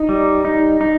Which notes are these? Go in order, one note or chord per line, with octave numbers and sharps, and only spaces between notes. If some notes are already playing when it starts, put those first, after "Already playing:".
Already playing: D#4
G3
D#4
D#4